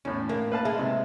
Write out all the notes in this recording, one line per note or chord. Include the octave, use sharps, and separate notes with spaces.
E2 A2 C#4
A2 A#3
B4 F5 A5
G#3 E5
C3